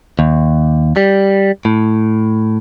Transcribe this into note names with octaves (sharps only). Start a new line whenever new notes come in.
D#2
G3
A2